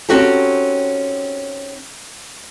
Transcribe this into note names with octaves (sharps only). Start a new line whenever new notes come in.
C4 C#4 D#4 F#4 G4 A4